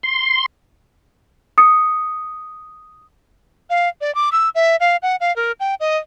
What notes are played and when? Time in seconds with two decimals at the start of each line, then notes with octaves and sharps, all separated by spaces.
0.03 C6
1.58 D#6 C#7
3.70 F5
4.01 D5
4.15 D6
4.32 E6
4.55 E5
4.80 F5
5.03 F#5
5.20 F5
5.36 A#4
5.60 G5
5.80 D#5